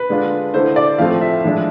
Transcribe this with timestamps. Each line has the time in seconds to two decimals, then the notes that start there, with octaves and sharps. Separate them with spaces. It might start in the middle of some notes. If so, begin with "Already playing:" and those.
Already playing: B4
0.09 D3 G#3 D4 F4
0.54 D3 A3 E4 C5
0.76 D5
0.98 A2 F3 A3 C4 F4 F5
1.21 E5
1.44 A2 F3 G#3 D4